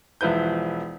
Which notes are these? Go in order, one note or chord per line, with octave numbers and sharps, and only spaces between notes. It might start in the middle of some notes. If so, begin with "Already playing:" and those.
E1 F3 E4 B4 G6